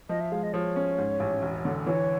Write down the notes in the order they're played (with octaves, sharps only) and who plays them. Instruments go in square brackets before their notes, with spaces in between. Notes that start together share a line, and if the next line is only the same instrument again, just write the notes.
[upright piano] F3 [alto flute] D#5
[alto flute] E5
[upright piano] G#3 [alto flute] F5
[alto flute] D#5
[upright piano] F3 [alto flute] C#5
[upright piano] C#4
G#2
A1
E1
D3
[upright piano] E3 [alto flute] C#5